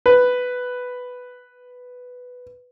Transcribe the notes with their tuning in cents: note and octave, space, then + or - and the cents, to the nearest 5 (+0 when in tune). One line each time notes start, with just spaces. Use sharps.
B4 +5